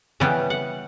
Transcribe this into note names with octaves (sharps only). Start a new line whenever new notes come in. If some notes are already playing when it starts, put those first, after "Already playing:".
C#3 E3 G3 B3 G5
F#5